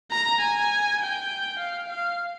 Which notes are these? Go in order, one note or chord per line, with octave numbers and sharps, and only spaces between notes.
A#5
G#5
G5
F5
F5